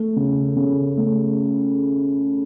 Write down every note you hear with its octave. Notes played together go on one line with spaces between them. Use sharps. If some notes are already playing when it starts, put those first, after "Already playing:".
Already playing: A3
C#3
C#3
A3